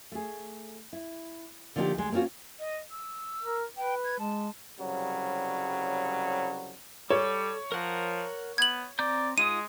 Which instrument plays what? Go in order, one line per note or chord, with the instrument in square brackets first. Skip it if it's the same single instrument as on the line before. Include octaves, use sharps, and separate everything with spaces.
[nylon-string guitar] A3 G#4
E4
D3 F3 A#3 C#4 D#4 G4
D2 G#3
A#3 C4 C#4 F4 F#4
[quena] D#5
E6
[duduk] A#4
[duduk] B4 [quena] G5
[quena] G#6
[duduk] G#3 [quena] A5
[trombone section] C2 C#3 F#3 G3
[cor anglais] G3 [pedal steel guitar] A4 [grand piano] C#5
[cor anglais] F3 [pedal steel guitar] A#4 F#5 A#5
[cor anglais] B3 [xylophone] G#6 F#7
[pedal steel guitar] C4 A#5 G6 [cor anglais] D5
[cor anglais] G#3 [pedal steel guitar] D#4 F4 D#6 [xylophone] D#7